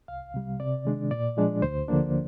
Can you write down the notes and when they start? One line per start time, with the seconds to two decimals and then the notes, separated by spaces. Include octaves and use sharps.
0.08 C2 F5
0.34 C3 G3
0.60 C3 D5
0.85 D#3 G#3 D4
1.11 A#2 D5
1.37 F3 G#3 D4
1.62 D2 C5
1.88 D3 F3 A#3 D4